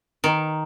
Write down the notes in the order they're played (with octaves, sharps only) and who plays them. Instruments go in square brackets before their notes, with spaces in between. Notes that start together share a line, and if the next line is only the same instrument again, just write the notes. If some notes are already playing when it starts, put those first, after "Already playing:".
[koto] D#3